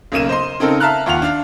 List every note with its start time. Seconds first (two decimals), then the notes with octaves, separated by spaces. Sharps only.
0.12 B1 C#3 A#3 D#7 E7
0.29 C5 D#5 C6
0.60 C#3 C4 D#4 A4 A#4
0.80 E5 F5 A5 A#5 F6 F#6
1.06 D#2 F4 F#5 F7
1.22 D4 F5